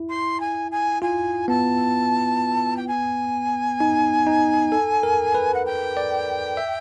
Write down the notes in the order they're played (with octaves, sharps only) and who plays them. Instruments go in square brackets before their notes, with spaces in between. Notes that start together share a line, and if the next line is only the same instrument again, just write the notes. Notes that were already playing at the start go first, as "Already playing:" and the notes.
Already playing: [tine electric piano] E4
[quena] C6
G#5
G#5
[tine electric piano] F4 [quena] G#5
[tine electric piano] B3 [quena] A5
[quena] G5
G#5
[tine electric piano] D#4
D#4
A4
A#4
B4
[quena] F#5
G5
[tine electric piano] D5
E5